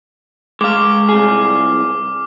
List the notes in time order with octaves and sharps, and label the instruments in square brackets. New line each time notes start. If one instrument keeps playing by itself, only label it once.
[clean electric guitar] G#3 F5 [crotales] D6 F6
[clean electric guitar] C2 G#4